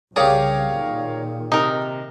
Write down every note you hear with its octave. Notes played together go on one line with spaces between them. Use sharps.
C2 C#3 G4 G#4 A#4 C#5 D5 F5
A#2 D#3
C3 D#4 A#4